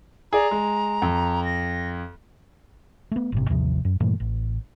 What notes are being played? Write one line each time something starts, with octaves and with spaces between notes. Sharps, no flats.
G#4 D5 A#5
G#3
F2
A#6
A3 B3
G1 A2 C3
A1 D#2 C3 F3
F#2
G2 A#2 E3 A3
A1